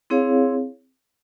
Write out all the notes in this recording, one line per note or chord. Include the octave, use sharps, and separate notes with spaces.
C4 E4 G#4 C#5 F5